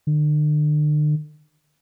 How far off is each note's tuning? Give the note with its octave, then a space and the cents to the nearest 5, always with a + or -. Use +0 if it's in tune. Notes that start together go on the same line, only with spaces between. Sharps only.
D3 +40